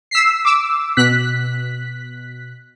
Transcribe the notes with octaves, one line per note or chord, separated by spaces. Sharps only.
E6 B6 C7
D6 E6
B2 F#6 B6